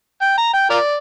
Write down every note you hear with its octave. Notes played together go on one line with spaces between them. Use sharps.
G5
A#5
G5
F4 A#4 D5